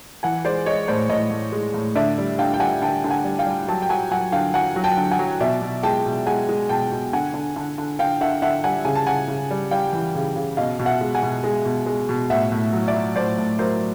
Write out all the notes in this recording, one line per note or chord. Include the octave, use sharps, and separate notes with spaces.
E3 F#5 G#5
G#3 C5 D5
G#3 C#5 D#5
A2 C5 D5
A2 C#5 D#5
A2
G#3
A2
D3 D5 E5
G3
D3 F5 G5
G5
G3 F#5 G#5
D3 G5 A5
D3
F#5 G#5
G3
F5 G5
G3
F#3 G5 A5
G5
F#3 F#5 G#5
F#3 F#5 G#5
D3 F5 G5
F#3 F#5 G#5
F#3
G5 A5
D3
F#5 G#5
F#3
B2 D5 E5
B2
G#3 G5 A5
B2
G#3 F#5 G#5
G#3
B2 G5 A5
B2
D3 F#5 G#5
D3
D3
D3
D3 F5 G5
D3 E5 F#5
D3 E5 F#5
G3 F#5 G#5
C#3 G#5
A5
C#3 F#5 G#5
C#3
G3
G3 F5 G5
E3
C#3
C#3
B2 D#5 F5
B2
E5 F#5
G#3
F#5 G#5
B2
G#3
B2
G#3
B2
A2 E5 F#5
A2
F#3
D5 E5
F#3
A2 C5 D5
A2
F#3 A#4 C5